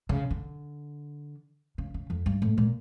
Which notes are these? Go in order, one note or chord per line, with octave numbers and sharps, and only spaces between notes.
C#3
D3
C#3
C#3
F2
G2
A2
A#2